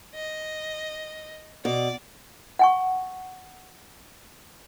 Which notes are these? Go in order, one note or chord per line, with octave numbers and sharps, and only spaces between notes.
D#5
B2 D5
F#5 G#5 C#6